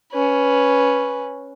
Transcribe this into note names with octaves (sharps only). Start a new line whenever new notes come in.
C#4 B4